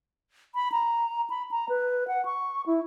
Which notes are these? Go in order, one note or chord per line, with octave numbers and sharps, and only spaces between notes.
B5
A#5
B5
A#5
B4
F#5
C#6
E4